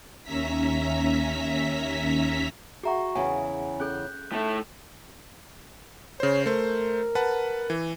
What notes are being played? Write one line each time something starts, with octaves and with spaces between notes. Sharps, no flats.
D#2 C#4 E5 A#5 B6
F#4 G#4 E5 F#5 A#5 C#6
E2 C#3 F#5 G#5
C#4 G#4 A4 F#6 G6
A2 A3 D#4
C#3 C5 C#5
A3 A#4 C5
B4 F#5 A5
E3